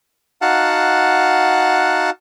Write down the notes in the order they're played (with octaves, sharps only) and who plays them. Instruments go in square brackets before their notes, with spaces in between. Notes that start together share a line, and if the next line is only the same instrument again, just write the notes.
[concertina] D#4 F#4 F5 F#5 A5